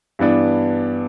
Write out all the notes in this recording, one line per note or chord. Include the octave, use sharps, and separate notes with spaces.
G2 E3 B3 D4